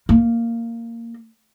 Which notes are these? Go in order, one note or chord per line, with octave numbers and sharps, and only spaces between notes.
A#3